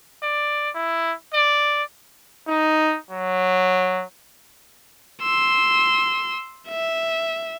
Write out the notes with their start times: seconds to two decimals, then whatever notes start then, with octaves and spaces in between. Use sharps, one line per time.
0.23 D5
0.74 E4
1.33 D5
2.48 D#4
3.11 F#3
5.22 C6 E6
6.69 E5